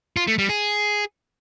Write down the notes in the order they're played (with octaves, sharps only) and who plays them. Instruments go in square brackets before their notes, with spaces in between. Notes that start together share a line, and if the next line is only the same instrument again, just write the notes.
[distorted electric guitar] F4
A3
G3
G#4